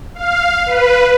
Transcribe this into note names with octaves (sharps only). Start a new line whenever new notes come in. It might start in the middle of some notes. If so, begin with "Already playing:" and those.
F5
B4